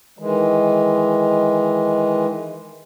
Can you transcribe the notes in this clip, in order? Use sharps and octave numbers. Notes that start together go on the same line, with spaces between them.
D#3 E3 G#3